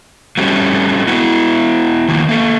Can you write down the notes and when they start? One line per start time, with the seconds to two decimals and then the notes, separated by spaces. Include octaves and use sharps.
0.38 F#3 G3 A3 C4 C#4
1.07 B3 E4 F#4
2.08 D#3 F3 A#3
2.29 A#3 A4